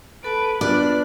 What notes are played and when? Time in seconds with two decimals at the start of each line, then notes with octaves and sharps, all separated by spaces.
0.24 A4 B4 A5 D7
0.61 B3 D4 F4 B4 D5 F#6